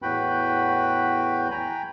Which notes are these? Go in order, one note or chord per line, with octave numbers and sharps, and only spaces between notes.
E2 A2 F#4 B4 G5 B5
G5 G#5 A#5 B5